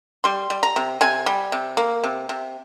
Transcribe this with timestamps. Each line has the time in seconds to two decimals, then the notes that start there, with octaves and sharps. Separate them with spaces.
0.24 G3 C6
0.50 G3
0.63 A#5
0.76 C3
1.01 C3 G#5
1.26 G3
1.52 C3
1.77 A#3
2.04 C3
2.29 C3